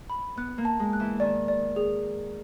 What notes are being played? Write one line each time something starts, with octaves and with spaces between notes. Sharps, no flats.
B5
B3 F#6
A#3
A5
G#3
F#6
E3
D#3 D5
D5
G#4